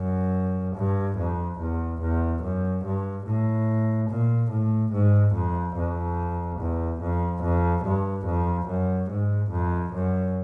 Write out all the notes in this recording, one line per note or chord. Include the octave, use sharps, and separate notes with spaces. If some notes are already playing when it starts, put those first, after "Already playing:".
Already playing: F#2
G2
F2
E2
E2
F#2
G2
A2
A#2
A2
G#2
F2
F2
E2
F2
F2
G2
F2
F#2
G#2
F2
F#2